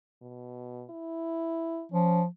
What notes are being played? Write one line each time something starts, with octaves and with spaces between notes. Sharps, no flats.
B2
E4
F3 C#4